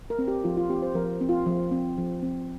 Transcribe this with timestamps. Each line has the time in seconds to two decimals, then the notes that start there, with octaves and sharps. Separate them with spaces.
0.10 A#4
0.19 C4
0.28 G4
0.44 F3 F4
0.57 F4
0.70 C4 G4
0.82 C5
0.95 F3 A#4
1.21 C4
1.29 F4
1.46 F3
1.71 C4
1.98 F3
2.23 C4